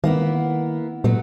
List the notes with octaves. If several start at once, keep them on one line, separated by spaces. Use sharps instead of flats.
D#3 A#3 B3 E4
A#2 F#3 A3 B3